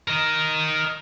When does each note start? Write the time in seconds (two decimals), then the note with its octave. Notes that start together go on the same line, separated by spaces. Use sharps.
0.07 A#4 D#5